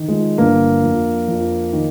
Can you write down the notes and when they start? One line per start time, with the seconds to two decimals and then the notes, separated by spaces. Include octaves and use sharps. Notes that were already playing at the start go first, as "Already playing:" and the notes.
Already playing: D#3
0.08 F3 G#3
0.38 G1 A#3 D4
0.83 F2
1.28 F2
1.73 D#3